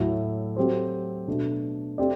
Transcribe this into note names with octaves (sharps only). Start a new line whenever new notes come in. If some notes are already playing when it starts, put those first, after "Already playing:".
Already playing: A2 F#3 A3 E4 A4
F#3 A3 C4 G4 C5
B2 A3 D4
A3 C4 G4 D5